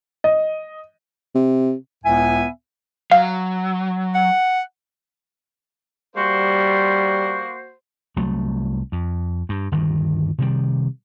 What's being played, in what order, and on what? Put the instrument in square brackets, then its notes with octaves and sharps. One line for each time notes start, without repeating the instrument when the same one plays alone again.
[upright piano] D#5
[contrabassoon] C3
[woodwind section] C#2 A2 B3 E5 G#5
[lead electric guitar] F#3 [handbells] F5
[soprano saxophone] F#5
[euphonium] G3 [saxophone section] A#3 F#4 C5
[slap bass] C2 F#3 A3
F2
G2
G1 D2 G2 D#3
C3 D#3 G3